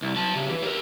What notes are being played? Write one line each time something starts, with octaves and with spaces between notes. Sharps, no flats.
C2
F#3 A5
C#3 G4
E3
G4 A#4